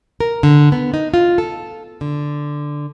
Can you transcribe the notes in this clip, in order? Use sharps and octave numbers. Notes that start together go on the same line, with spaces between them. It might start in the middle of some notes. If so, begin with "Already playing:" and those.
A#4
D3
B3
D#4
F4
A4
D3